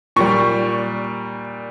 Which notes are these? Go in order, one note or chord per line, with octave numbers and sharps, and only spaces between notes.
A#2 G3 C#6